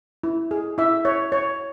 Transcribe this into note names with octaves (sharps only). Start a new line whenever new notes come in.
E4
G#4
E4 E5
C#5
C#5